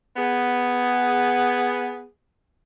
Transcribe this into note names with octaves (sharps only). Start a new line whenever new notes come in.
B3 G#4